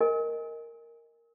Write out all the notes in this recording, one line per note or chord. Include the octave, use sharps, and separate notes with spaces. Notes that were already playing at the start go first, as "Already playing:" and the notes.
A#4 D#5 G#5